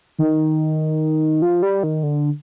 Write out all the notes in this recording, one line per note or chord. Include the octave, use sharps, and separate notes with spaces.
D#3
F3
G3
D#3
D3